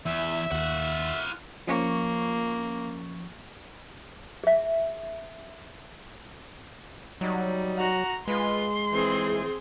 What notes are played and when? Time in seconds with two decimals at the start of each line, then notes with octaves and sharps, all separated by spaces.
0.06 E2 E5
0.52 D#2 F4 F#5
1.67 F3 A#3 C#4 C#6
4.44 G#4 E5
7.21 F#3 G3 D#4
7.78 F#4 A#5
8.28 G#3 F4 B4 C6
8.93 F2 A2 E3 C4 G#4